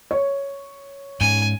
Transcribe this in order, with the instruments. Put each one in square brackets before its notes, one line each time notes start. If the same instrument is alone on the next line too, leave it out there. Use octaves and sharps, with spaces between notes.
[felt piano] C#5
[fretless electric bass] G#2 C#4 [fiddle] G#5